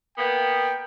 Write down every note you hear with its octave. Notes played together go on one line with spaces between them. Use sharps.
A#3 B3 G5